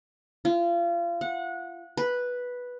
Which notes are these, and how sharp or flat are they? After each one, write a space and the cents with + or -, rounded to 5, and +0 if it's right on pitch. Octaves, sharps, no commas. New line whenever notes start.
F4 -30
F#5 -25
B4 -5